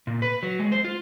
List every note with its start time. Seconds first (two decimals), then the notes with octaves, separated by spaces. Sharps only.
0.07 A#2
0.22 B4
0.43 F#3
0.59 G#3
0.72 C5
0.84 F4